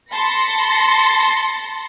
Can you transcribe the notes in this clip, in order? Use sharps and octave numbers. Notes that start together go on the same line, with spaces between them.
A5 B5 C6 A#6 C#7